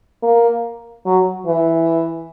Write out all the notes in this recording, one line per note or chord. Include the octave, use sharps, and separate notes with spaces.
A#3
F#3
E3